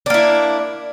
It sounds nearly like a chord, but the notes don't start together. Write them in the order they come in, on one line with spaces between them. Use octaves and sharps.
D4 A#3 E4